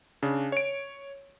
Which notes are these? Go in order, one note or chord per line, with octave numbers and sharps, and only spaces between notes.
C#3 D4
C#5 D7